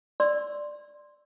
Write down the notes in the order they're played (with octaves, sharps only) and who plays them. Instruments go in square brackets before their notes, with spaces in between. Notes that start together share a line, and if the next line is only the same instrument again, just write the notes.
[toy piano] D5 C6 E6